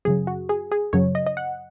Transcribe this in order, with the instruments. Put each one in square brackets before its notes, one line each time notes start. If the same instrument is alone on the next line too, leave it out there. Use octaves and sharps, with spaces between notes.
[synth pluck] F#2 C#3 F#3 G#4
F#4
G#4
G#4
F#2 C#3 F#3 C#5
D#5
D#5
F#5